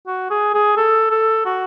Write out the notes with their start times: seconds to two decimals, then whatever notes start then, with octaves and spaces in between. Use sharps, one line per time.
0.07 F#4
0.31 G#4
0.54 G#4
0.77 A4
1.11 A4
1.45 F#4